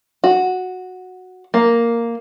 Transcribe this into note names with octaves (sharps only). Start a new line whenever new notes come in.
F#4
A#3